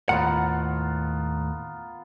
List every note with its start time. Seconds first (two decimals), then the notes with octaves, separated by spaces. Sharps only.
0.09 D#2 A2 B3 F4 A#4 F#5